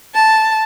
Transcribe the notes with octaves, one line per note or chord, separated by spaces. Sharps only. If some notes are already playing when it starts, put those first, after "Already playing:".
A5